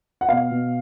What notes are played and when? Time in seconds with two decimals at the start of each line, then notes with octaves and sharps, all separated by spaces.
0.21 F#5
0.29 B2 F5
0.51 B2